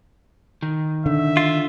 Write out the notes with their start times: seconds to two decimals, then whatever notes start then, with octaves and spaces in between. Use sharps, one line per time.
0.62 D#3
1.06 D3 E5
1.37 F4